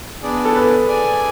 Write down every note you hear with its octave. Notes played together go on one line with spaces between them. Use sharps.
B3 D4 G#4 D5
A4
B4
G#4 D5 G#5